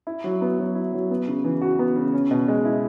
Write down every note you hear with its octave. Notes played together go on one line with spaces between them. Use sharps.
E4
F#3
B3
F#3
E4
F#3
B3
C#3
E3
F#4
B3
C#3
C#4
B2
G#3
E4